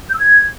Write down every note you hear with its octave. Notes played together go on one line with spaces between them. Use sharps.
G6
E6
G#6